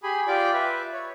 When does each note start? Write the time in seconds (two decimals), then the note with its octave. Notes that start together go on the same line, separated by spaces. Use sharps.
0.03 G4 G#4 G#5 B5
0.27 F4 G4 D5 G5 D6
0.53 B4 E5
0.93 C#5